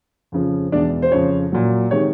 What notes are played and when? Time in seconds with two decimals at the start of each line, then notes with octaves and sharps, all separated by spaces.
0.32 F2 C#3 F3
0.72 E2 B2 G#3 D4 D5
1.02 C5
1.11 F2 C#3 F3 C#5
1.52 A#2 F#3
1.91 C3 D#3 G#3 C#5